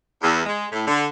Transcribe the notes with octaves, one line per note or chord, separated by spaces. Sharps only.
E2
G#3
A2
D3